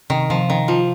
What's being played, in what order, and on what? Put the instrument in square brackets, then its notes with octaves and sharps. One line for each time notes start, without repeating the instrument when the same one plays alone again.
[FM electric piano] C3 [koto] D#3
[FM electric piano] C3 [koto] F3
[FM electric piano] C3 [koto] D#3
[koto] F3 [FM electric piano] F4